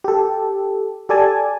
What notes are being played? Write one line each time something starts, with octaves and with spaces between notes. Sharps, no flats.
G4 A4
G4 A4 D5 G#5 A5